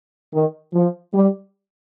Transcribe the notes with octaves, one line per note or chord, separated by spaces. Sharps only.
D#3
F3
G3